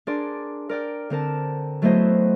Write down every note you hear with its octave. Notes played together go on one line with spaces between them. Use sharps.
D4 G#4 A#4 D5 C6
A#4 D5 G5 F6
D3 C4 A#4 A5
F#3 A3 B3 E4 C5 D#5